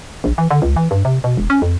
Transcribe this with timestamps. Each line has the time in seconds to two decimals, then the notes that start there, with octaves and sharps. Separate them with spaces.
0.24 A#1
0.38 E3
0.51 D3
0.62 C#2
0.76 E3
0.91 G2
1.05 C3
1.24 B2
1.37 E1
1.50 C#4
1.62 F2